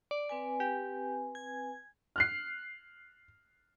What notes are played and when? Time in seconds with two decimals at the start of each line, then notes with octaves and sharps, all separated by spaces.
0.11 D5
0.29 C4 B4 G#5
0.60 G4
1.35 G#6
2.16 F6 F#6 C7